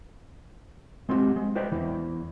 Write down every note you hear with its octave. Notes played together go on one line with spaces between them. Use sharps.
G#3 C4 C#4 F#4 G4
G#3
B4 C5 D5 D#5 G5
E2 E3